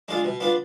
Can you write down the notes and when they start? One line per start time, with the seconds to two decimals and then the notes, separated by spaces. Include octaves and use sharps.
0.08 G#3 D4 F4
0.25 B2
0.40 B3 D4 F4